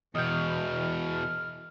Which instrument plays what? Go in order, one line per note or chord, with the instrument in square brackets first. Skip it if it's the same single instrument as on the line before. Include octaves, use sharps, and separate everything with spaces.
[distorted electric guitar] E2 B2 [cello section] E3 [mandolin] D#5 G5 [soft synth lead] F6